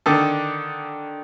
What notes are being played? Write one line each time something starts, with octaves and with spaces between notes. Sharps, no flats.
D3 D#3 A4